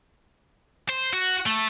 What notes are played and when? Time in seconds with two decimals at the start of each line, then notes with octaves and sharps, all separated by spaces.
0.89 C5
1.13 F#4
1.46 A3